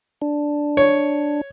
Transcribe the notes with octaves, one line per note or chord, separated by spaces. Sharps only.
D4
C#5